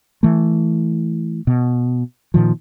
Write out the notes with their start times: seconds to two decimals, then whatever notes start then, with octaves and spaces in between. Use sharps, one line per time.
0.23 E3 A3
1.47 B2
2.34 A#2 D#3 F3